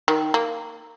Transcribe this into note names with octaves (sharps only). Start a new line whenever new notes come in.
D#3
A#3